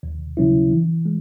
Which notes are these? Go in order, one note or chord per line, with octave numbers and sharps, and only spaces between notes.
D#2
C#3 F#3 C#4 E4
E3
G#3